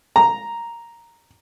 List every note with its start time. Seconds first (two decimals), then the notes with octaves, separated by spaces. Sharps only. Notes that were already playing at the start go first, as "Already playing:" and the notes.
0.16 A#5